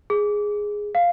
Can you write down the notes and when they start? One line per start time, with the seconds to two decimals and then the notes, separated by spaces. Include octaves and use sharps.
0.10 G#4
0.95 F5